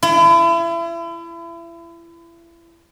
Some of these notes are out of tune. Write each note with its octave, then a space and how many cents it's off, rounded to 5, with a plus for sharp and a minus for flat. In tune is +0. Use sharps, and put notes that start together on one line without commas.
E4 +35